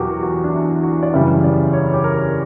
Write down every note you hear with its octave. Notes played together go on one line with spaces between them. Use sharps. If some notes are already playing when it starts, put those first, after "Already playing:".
Already playing: E2 B2 F#3 F#4 G4 A#4
F#4
D4
E4
F#4
D5
F#2 C#3 E3 G3 E5
D5
C#5
G4
A#4